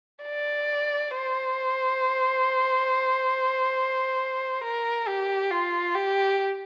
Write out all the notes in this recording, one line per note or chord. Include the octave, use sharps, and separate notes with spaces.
D5
C5
A#4
G4
F4
G4